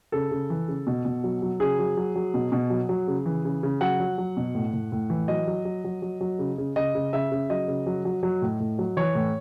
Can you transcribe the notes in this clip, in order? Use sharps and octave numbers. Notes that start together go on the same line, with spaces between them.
C#3 A4
C#3
E3
C#3
B2
B2
F#3
F#3
C#3 G#4
F#3
F#3
F#3
B2
B2
F#3
F#3
C#3
E3
C#3
C#3
F#3 F#5
F#3
F#3
B2
A2
A2
A2
E3
F#3 D#5
F#3
F#3
F#3
F#3
F#3
C#3
C#3
C#3 D#5
C#3
C#3 E5
C#3
F#3 D#5
C#3
F#3
F#3
F#3
A2
A2
F#3
E3 C#5
A2